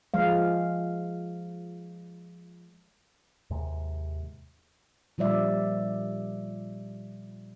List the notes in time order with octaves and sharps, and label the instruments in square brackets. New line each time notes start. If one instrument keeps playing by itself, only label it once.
[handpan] F3 G#3 F5
[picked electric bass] D#2 G#2 C3 G#3
[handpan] A#2 F3 G3 D5 E5